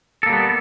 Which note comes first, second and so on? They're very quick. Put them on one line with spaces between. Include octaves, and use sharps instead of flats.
A4 A#3 G3 B3